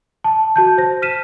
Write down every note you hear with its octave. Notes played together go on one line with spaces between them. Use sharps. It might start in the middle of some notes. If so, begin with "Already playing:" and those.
A5
F#4 A5 G6
C5 A#6
F6 B6 D#7 E7